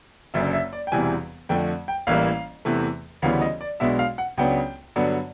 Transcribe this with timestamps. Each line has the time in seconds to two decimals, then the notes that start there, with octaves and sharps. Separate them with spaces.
0.34 F#1 F#2 D3 E5
0.53 E5
0.73 D5
0.87 G5
0.92 E1 E2 C3 E3 G3 G#5
1.49 F2 D3 F3 A3 G5
1.88 G5
2.07 A1 A2 E3 G3 A#3 F5
2.65 E2 C3 E3 A3
3.22 D2 C#3 E3 G3 B3 F5
3.42 D#5
3.61 D5
3.80 B1 B2 G#3 B3 D4 E5
3.99 F5
4.18 F#5
4.38 C#2 C#3 F#3 B3 D4 G5
4.96 G2 D3 F#3 B3 D4